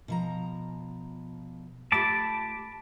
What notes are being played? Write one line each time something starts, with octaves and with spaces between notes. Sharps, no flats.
B2 F3 A#5
A3 F4 G4 A5 B5 D6